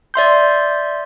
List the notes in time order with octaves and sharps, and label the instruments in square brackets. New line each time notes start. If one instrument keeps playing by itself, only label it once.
[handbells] D5 E5 C6 G6